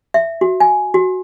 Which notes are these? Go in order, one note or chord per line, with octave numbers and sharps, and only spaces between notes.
E5
F#4
G#5
F#4